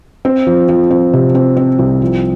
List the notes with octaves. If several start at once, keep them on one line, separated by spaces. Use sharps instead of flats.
C4
F3
F3
C4
C3
C4
C4
C2
F3